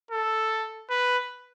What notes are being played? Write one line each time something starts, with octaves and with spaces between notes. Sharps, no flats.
A4
B4